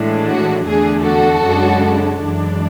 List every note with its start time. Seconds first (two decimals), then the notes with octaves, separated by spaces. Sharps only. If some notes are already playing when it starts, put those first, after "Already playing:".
Already playing: A2 E3 G#3 D4
0.27 F#4
0.65 E2 D3 A3 D4 G#4
1.03 F#4 A4
1.42 F#2 C#3 G#3 D4
2.19 F#2 E3 G#3 D4